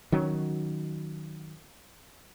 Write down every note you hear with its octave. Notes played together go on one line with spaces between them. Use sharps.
D#3 F#3 C#4